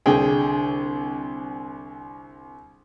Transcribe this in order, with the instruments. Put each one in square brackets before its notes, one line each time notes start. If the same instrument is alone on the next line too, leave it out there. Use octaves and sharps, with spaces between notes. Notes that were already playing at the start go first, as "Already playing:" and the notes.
[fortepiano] C2 D3 G#4 G5